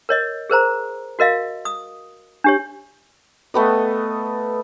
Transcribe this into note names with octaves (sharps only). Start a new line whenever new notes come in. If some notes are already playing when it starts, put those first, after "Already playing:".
A#4 C#5 D#5
G#4 A#4 C5 A#5
F#4 A#4 D#5 F5
D#6
D4 G4 C#5
A3 B3 D#5